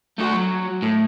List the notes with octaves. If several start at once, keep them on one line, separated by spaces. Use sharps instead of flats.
A3 F#4
F#3
A2